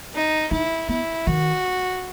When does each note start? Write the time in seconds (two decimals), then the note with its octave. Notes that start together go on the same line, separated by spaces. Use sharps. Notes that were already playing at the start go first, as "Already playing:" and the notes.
0.14 D#4
0.51 D#4 E4
0.89 B3 E4
1.27 D#3 F#4